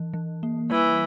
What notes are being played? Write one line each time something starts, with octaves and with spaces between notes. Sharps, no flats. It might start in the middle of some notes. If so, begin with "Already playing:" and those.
Already playing: E3
E3
A#3
E3 G3